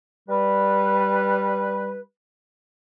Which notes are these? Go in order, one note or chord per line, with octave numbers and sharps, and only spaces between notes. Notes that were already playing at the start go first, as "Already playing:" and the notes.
G3 B4